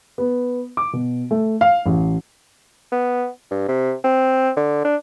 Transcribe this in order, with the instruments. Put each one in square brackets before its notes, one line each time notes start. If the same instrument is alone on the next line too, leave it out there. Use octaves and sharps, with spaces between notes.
[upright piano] B3
D6
B2
A3
F5
A1
[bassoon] B3
G2
C3
C4
D3
D4